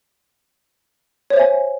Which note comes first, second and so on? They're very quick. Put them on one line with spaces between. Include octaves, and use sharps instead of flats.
C#5 C5 E5 G#5